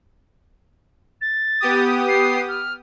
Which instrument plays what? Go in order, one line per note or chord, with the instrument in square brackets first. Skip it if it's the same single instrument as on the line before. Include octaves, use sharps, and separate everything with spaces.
[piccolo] A6
[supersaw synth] B3 G4 D#6
[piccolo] C7
F6